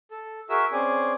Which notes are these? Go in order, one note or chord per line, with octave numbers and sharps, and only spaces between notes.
A4
F#4 G#4 A#4 E5 E6
C4 C#4 G#4 D5 G#5